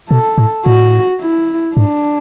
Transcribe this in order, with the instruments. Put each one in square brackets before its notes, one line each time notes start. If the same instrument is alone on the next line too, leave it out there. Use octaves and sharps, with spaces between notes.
[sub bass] B2 [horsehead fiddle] A4
[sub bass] A2
[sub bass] A2 [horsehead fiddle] F#4
[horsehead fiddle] E4
[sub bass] G#2 [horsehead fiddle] D4